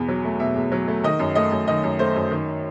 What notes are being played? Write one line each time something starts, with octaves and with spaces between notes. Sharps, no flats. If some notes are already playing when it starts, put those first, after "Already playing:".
Already playing: E2 B2
F#3
A3
B2 E5
E2
F#3
A3
D#3 D#5
F#2
A3 D#5
F#2
D#3 D#5
F#2
A3 C5
F#2
D#3